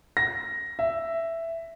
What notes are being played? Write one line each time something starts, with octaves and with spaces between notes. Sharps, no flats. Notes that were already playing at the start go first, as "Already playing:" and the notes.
A#6
E5